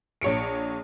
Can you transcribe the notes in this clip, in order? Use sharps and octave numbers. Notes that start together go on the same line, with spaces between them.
A#1 C#5 C#7 D7